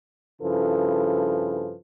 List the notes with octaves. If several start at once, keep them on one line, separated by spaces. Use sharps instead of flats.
G2 C#3 F3 E4 A4 B4